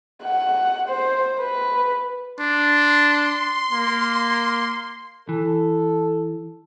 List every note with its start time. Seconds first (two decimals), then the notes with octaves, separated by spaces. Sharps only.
0.24 F#5
0.88 C5
1.40 B4
2.39 D4 C6
3.71 A#3
5.29 E3 A4